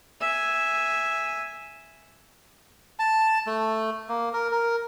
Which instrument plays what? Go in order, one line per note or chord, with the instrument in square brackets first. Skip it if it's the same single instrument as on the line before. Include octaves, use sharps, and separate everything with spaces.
[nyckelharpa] E5 G#5
[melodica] A5
A3
A#3
A#4
A#4